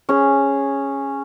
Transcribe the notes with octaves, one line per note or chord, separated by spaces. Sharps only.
C#4 G#4